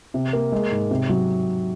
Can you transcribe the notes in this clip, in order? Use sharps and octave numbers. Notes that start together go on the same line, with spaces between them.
C3
A#3
G#3
G#2
C3
F#3